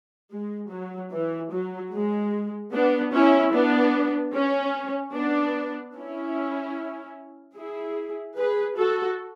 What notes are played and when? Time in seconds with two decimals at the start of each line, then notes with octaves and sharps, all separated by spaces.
0.32 G#3
0.71 F#3
1.12 E3
1.52 F#3
1.93 G#3
2.73 B3 D4
3.13 C#4 E4
3.53 B3 D4
4.34 C#4
5.14 B3 D4
5.96 C#4 E4
7.56 E4 G#4
8.37 G#4 B4
8.77 F#4 A4